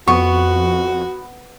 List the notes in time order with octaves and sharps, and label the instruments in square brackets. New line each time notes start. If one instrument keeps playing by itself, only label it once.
[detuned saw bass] F2 [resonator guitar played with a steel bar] B3 [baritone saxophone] F#4 [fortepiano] C#6